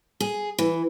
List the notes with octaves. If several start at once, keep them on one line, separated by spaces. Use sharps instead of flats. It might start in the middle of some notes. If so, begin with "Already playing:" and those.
G#4
E3